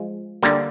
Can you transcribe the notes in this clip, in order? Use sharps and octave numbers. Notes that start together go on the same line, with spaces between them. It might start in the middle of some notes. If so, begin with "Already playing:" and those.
Already playing: F3 G#3
D3 G3 A#3